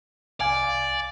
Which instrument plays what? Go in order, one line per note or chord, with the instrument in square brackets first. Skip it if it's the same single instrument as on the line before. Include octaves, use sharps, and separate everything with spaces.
[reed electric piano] C2 F5 G#5 [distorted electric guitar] D5